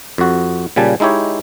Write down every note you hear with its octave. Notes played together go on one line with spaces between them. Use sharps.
F2 F#4
A#2 C#3 G3 G#5 A5
G#3 D#4 E4 G4 C#5